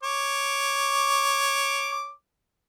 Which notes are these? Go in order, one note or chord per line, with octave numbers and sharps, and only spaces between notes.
C#5 D6